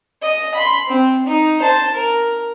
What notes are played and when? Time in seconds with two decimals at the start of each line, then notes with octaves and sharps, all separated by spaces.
0.22 D#5
0.55 B5 C6
0.88 C4
1.26 D#4
1.62 C5 A5
1.93 A#4